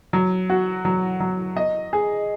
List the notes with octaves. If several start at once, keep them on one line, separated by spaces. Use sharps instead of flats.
F#3
F#4
F#3
F#3
D#5
G#4